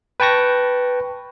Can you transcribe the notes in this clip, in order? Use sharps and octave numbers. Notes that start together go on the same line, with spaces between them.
B4 G5 A5 C#6 A#6